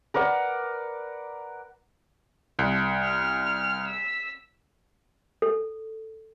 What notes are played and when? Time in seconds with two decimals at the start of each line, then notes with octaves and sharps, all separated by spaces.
0.14 A#4 B4 D5 F#5
2.59 C2
3.04 F6
3.88 E6 B6
5.42 A4